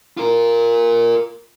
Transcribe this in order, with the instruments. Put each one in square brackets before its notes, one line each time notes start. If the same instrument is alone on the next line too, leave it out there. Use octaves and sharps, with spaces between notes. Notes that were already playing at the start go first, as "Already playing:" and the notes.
[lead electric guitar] F4 A#4